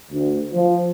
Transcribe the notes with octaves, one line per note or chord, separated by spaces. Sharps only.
D2
F3